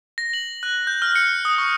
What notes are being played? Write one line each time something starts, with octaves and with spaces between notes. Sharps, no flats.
A#6
F#7
F#6
G6
F6
C#7
D#6
C#6